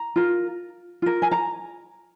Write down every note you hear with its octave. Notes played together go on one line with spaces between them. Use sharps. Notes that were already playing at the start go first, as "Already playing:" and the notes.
Already playing: A#5
F4 A#4
F4 A#4
G#5
A#5